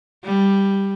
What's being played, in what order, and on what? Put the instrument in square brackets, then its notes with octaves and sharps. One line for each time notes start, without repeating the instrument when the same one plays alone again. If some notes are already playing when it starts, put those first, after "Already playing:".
[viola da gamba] G3